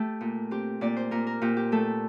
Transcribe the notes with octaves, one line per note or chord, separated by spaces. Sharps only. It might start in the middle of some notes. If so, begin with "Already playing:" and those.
Already playing: A3 G4 A4
A#2
C4 G4
A#2 D5
C5
A#2 A#4
A#4
A#2 G4
G4
A3 A4